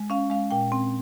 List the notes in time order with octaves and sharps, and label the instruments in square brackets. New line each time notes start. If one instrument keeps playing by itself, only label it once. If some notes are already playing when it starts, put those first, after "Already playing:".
Already playing: [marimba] G#3
C#4 F5
G#3 F5
A#2 G5
C4